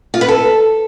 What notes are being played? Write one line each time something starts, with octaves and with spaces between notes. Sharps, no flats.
F4
B4
A4